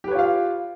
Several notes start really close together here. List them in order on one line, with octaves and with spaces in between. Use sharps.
G4 B4 C#5 F4 F5